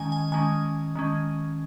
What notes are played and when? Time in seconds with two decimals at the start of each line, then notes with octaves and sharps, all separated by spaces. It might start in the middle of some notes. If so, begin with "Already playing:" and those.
Already playing: D#3 G#3 C#4 G#5
0.12 G#5
0.32 D#3 G#3 C#4 G#5
0.95 D#3 G#3 C#4